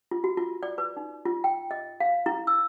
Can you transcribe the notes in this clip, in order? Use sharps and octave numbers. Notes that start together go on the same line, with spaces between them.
F4
F#4
F4
D5
B4
D#4
F4
G5
D#5
F5
E4
E6